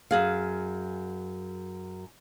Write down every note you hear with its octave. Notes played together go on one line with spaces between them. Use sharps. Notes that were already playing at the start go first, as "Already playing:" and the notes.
F#2 G#4 F5